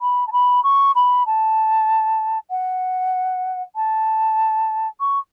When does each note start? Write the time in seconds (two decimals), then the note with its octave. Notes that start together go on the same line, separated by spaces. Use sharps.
0.01 B5
0.27 A5
0.32 B5
0.63 C#6
0.95 B5
1.26 A5
2.50 F#5
3.76 A5
5.00 C#6